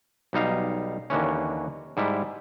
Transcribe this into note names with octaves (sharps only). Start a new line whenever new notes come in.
B1 G3 D#4 F5
D#2 D3 E3 C#4
G#2 G3 E4